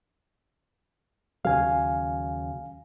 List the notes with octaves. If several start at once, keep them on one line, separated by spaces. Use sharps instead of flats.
D#2 C#3 F#3 F5 G#5